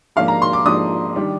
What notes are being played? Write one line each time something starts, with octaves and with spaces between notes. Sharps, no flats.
G#2 F3 A#3 D4 F5
A#5
C6
D6
G#2 F3 A#3 D4 D#6
D#3 G3 D4